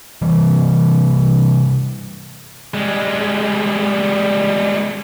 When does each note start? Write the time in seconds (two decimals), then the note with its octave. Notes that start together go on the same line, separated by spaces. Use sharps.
0.22 C3 E3 G3
2.74 G3 G#3